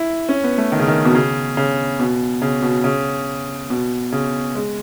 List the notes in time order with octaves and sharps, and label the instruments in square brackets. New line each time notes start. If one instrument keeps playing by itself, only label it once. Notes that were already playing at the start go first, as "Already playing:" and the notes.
Already playing: [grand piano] E4
C#4
B3
A3
D#3
C#3
D#3
B2
C#3
C#3
B2
C#3
B2
C#3
B2
C#3
G#3